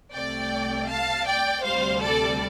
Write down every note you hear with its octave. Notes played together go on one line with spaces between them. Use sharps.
C2 C3 A3 D5 G5
F5 A5
D5 G5
D2 C3 G3 C5 F5
A4 D5